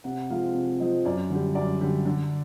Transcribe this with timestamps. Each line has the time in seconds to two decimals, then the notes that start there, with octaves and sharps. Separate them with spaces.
0.04 C3 F#5
0.30 F3 G#3 C4 F5
0.55 C3
0.80 F3 G#3 C4 D#5
1.05 F#2 D5
1.30 D3 G3
1.55 F#2 D5
1.81 D3 G3
2.05 D3